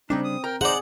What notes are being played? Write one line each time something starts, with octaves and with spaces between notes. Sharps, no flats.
C#3 G3 C4 D4 D#4
D#6
A#4 G5 A#5
D#4 G#4 C5 D5 F#5